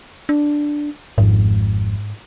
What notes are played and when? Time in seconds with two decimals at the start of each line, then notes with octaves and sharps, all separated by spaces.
0.29 D4
1.18 G#1 F2 G#2